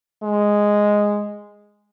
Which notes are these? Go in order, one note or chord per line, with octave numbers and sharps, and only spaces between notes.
G#3